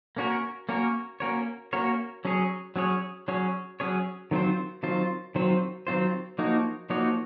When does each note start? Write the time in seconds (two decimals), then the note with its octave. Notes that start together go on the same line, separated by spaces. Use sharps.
0.17 A#3 C#4 F#4 A#4 C#5
0.69 A#3 C#4 F#4 A#4 C#5
1.20 A#3 C#4 F#4 A#4 C#5
1.73 A#3 C#4 F#4 A#4 C#5
2.25 F#3 C#4 G#4 C#5
2.76 F#3 C#4 G#4 C#5
3.28 F#3 C#4 G#4 C#5
3.80 F#3 C#4 G#4 C#5
4.31 D#3 F#3 C4 F4 C5
4.83 D#3 F#3 C4 F4 C5
5.35 D#3 F#3 C4 F4 C5
5.87 D#3 F#3 C4 F4 C5
6.38 F3 A#3 D#4 F#4 C#5
6.90 F3 A#3 D#4 F#4 C#5